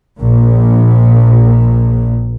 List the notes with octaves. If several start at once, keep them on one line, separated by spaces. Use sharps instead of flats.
A#1 A#2